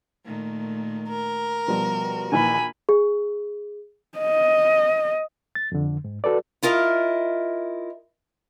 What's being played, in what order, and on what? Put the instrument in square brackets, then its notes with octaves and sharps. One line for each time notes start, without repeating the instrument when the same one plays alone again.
[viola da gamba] A#2 D#3 A3
[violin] A#4
[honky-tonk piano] B2 F3 G3 [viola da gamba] F#4
[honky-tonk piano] A#1 D#3 E3 [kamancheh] G#5 B5
[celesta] G#4
[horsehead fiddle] D#5
[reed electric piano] A6
F2 D3
G#2
F#4 A4 B4 D5
[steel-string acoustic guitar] E4 F4 A#4 D#5